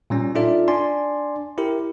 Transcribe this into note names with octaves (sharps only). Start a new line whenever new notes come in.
A#2 G3 C#4
D4 D#4 F4 A4 D5 E5
D4 D5 G#5 C6
E4 G4 A#4